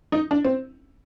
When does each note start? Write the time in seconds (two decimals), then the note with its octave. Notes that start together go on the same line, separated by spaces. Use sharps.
0.12 D#4
0.31 D4
0.45 C4